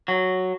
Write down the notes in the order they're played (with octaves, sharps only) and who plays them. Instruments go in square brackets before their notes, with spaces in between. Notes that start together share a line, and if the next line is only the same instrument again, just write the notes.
[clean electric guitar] F#3